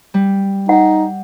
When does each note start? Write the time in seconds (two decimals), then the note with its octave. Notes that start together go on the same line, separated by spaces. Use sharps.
0.14 G3
0.69 D#4 F#5